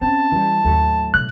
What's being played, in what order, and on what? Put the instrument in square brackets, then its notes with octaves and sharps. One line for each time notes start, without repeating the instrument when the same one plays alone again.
[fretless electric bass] C4 [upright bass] C#4 [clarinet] A5
[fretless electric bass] E3 G3
[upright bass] D#2 [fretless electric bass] A2 F#3 A3
[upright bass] B2 [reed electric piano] F#6